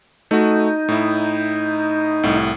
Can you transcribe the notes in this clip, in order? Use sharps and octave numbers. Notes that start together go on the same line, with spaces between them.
A3 D#4 F#4
A2 E4
C2 A2